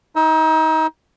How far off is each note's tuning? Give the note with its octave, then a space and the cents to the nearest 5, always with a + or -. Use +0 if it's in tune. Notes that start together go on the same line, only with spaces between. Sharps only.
D#4 +30 E6 -30